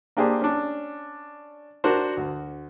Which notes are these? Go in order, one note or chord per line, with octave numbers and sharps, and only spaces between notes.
A#3 D4 G4 G#4 C5 D5
C#4 D4
D4 F#4 A#4 C5
D2